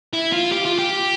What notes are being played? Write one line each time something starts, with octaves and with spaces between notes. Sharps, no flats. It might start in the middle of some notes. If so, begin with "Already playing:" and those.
E4
F4
G4
F4
G4